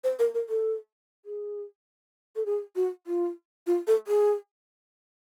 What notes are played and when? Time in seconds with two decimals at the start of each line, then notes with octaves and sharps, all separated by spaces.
0.04 C5
0.19 A#4
0.34 A#4
0.49 A4
1.25 G#4
2.36 A4
2.46 G#4
2.76 F#4
3.07 F4
3.67 F4
3.87 A4
4.07 G#4